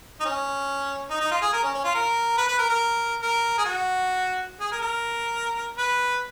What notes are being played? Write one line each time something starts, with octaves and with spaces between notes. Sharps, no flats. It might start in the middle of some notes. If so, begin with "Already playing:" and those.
D#4
C#4
D#4
D#4
F4
G#4
A#4
C#4
C#4
F4
A#4
B4
B4
A#4
A#4
A#4
G#4
F#4
G#4
A#4
A#4
B4